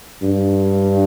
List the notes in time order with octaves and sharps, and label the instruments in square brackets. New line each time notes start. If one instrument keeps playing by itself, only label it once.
[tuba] G2